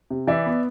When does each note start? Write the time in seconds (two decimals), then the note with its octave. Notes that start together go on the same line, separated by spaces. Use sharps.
0.10 C3
0.27 E3 D5 E5
0.46 B3